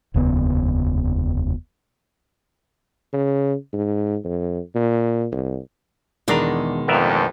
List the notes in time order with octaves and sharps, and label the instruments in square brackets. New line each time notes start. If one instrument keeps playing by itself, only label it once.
[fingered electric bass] F1 D#2 C#3 B3
[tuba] C#3
G#2
F2
A#2
C2
[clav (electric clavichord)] E2 D4 A#5 [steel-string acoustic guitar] B2 D#3 G#3
[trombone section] A1 F2 [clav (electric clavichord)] B3 A#4 E5